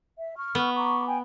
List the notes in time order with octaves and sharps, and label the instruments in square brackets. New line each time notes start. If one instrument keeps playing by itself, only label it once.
[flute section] E5
C#6 F6
[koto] B3
[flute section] A#5 C#6 D6
G5 G#5